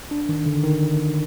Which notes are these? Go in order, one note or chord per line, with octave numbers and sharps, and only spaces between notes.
D4
D#3
D3
D#3